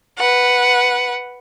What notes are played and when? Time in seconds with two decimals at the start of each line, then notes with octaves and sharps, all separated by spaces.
0.18 B4 F#5